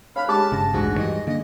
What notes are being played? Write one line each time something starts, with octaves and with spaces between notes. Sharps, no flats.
C#5 F5 B5 F6 F#6
G#3 G4 A5 D6
F#1 G2 C#3 A#6
D1 A1 D2 G#2 F#4
E3 G3 D#5
D3 A#3 D#5